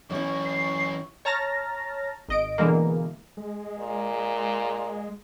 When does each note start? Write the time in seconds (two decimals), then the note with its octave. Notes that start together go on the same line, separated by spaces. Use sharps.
0.11 F#2 E3 C#4 E4 C#6
0.45 C7
1.25 C#5 A5 A#5 F6 A6 A#6
2.28 G#1 D#5 D7
2.58 B2 D3 E3 G#3 A#3
3.37 G#3
3.78 A#2